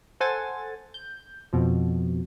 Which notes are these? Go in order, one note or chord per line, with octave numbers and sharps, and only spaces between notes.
A4 C5 F#5 G#5 A6
G6
F2 B2 F3